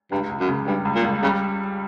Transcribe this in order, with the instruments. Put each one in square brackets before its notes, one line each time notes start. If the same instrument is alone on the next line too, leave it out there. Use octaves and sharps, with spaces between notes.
[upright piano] C#2 [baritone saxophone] G2
[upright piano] C#2
[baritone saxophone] F#2
[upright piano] C#3
[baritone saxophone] G2 [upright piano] G3
[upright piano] C#2
[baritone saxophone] A#2
[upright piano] C#2
[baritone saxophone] C#3 [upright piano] G3